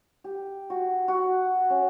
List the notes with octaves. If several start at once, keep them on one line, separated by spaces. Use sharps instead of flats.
G4
F#4
F#4
C#4